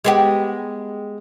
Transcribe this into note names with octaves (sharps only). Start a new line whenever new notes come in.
G#3 B3 G4